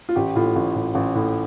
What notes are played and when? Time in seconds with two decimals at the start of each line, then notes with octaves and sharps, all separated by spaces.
0.09 F4
0.15 A1 G4
0.36 A2 F4
0.56 A1
0.75 A2
0.95 A1
1.15 A2